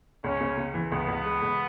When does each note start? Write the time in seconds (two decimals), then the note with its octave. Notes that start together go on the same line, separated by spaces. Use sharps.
0.24 C#2 C#4
0.41 C#3
0.57 C#3
0.74 E3
0.92 C#2 B3
1.08 C#2
1.25 G#3
1.42 C#2